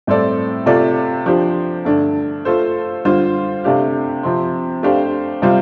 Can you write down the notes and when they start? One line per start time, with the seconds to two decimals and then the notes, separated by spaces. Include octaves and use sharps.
0.07 A2 G3 C4 A4 D5
0.66 C3 A3 F4 A4 D5
1.26 F3 D4 G4 C5
1.85 G2 D3 A3 D4
2.45 A3 F4 A4 C5
3.05 D3 G3 F4 C5
3.64 C3 A3 D4 G4 F5
4.23 C3 F3 C4
4.83 A3 D4 G4 C5 F5
5.42 C3 G3 F4 C5 F5